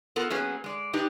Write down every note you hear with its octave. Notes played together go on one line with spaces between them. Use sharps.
B3 F4 A4 A#4
F#3 A#3 B3 C#4 G#4
G#3 D5
D4 D#4 G4 B4